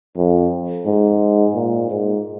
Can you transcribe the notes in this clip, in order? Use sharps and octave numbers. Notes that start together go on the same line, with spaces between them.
F2
G#2
A#2
G#2